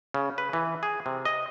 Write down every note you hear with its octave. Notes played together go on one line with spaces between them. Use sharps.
C#3
B4
E3
G#4
C3
D#5